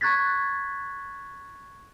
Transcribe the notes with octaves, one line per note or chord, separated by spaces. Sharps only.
A#5 C#6 F#6 G#6 A6 B6